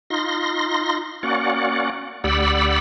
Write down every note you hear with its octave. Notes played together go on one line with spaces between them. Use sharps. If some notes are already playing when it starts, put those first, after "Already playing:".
D#4 F4 C6 A#6
A#3 C#4 F#4 D5 F#5
D2 G4 D5 F#5 B5 E6